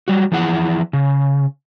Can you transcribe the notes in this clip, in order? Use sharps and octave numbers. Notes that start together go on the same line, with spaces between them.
F#3 G3 F#4
E3 F3 E4 G#4 F#5
C#3